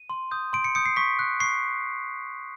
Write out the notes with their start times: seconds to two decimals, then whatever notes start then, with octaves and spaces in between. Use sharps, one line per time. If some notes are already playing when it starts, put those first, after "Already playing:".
Already playing: D#7
0.10 C6
0.31 D#6 G6
0.53 C6 D7
0.64 C#7
0.75 D#6 G6 C#7
0.85 C7
0.96 C#6 B6
1.19 F#6
1.40 C#6 C7